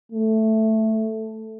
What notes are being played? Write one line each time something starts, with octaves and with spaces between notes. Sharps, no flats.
A3